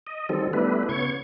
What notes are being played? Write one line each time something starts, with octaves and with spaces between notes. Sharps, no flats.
D#5
D#3 F#3 G3 C4 A4
G3 A3 B3 D4 E4 B4
C#3 B3 C#5 C#6 G#6